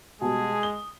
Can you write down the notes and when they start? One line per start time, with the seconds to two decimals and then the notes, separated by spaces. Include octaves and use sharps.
0.21 B2 G3 G#3 G#4 A5
0.63 D#6 G7